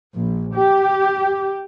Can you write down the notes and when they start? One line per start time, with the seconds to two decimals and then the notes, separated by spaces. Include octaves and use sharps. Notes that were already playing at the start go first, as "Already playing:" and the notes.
0.14 A#1
0.55 G4